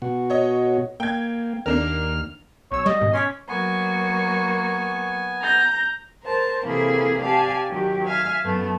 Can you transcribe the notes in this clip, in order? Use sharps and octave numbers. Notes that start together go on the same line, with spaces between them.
B2 F#4
C#5 D#5
A#3 G5 G#6
D#2 A#3 D4 A#4 F6
B1 C#5 E6
G3 D#5
G#2 B2 D#3
C#4 C6 D6 B6
F#3 A#3 B3 G#5 C#6
A#5 G6 A#6
A#4 C5 A5
C3 E3 A#3 E4 G#4 A4
G4 D5 F5 G#5 A5
D#3 F#3 G4
E5 F5 G#5 F6
F#2 A3 B3